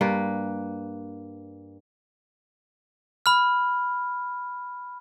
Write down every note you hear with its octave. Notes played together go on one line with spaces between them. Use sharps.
G2 A#3 B4
B5 F6